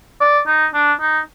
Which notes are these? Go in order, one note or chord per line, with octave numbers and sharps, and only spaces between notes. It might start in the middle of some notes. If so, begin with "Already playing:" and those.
D5
D#4
D4
D#4